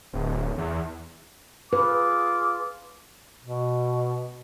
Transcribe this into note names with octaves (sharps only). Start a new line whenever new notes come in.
D1
E2
F4 G#4 B4 D6
B2